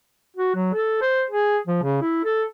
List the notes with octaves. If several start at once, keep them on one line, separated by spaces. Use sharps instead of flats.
F#4
F#3
A4
C5
G#4
F3
C#3
E4
A4